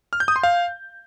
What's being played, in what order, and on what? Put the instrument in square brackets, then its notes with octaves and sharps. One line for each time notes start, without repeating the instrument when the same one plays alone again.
[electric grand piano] F6
G6
D#6
C6
F5